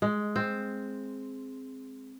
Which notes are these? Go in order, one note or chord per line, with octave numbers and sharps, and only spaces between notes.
G#3
C4